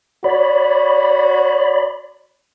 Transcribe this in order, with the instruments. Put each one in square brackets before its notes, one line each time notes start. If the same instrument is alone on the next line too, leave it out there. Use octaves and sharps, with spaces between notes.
[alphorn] F#4 [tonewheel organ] C#5 D5 B5